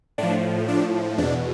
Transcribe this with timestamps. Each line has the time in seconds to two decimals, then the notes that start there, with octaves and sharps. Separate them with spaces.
0.18 A2 F3 D4
0.68 D4
1.18 E2 B2 D4